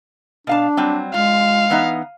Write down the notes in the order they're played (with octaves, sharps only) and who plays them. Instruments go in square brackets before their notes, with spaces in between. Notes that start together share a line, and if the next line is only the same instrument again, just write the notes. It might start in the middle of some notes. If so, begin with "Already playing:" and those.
[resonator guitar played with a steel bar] B2 F5 A5 [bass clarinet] D4
[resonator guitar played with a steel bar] F#3 G3 C4
[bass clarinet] G#3 [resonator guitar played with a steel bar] F4 [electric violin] F5
[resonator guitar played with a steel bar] E3 B3 D#4